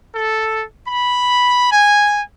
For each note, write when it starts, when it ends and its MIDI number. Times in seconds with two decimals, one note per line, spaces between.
0.14 0.64 69
0.88 1.70 83
1.71 2.21 80